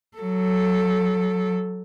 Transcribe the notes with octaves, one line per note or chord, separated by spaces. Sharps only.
F#3 A4